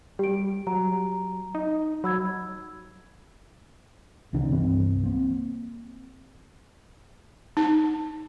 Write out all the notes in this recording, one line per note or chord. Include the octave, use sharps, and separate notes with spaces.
G3 G4 D7
F#3 A#5
D#4
F#3 B5 E6 G#6
C2 C3 D#3 D4
C2 G2 E3 C4
A#3 C4
D#4